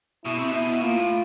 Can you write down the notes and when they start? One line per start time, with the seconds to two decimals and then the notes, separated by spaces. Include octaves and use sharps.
0.25 B2 E4
0.38 C3
0.51 B2 E4
0.81 A#2 F4
0.96 A2